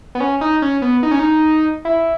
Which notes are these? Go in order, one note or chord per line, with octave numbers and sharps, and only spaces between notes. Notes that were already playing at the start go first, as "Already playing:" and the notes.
B3
C#4
D#4
C#4
B3
D#4
C#4
D#4
E4